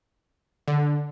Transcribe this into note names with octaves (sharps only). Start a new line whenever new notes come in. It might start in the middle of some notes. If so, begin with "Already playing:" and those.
D3